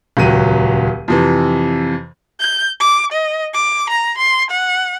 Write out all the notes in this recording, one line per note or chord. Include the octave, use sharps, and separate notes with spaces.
D#1 C#2 F#3 D#7
F2 C3 E3
G6
D6
D#5
D6
A#5
C6
F#5